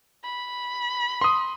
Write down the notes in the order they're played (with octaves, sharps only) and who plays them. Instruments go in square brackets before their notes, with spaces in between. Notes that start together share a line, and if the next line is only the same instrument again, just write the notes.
[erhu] B5
[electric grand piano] C6 D#6